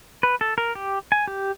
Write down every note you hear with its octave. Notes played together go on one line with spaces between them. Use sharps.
B4
A4
A#4
G4
G#5
G4